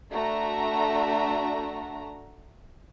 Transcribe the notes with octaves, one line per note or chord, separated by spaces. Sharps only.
A3 D4 F#4 A#5